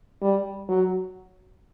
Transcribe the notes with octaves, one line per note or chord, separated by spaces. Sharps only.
G3
F#3